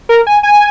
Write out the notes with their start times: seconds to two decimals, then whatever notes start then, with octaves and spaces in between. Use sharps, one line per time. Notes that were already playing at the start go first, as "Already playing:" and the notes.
0.09 A#4
0.27 G#5
0.43 G#5